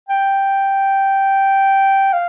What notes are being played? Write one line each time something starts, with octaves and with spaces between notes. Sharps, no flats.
G5
F5